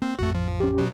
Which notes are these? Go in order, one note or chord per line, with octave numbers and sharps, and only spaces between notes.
A#3 C4
A1 F2 A3 F#4
F3
C#4 G4
B2 F#3